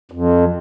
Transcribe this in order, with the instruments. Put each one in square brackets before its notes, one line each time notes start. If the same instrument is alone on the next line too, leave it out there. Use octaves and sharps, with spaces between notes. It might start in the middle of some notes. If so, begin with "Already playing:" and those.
[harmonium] F2